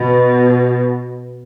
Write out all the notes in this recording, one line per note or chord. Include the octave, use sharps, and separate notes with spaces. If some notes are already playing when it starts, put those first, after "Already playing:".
Already playing: B2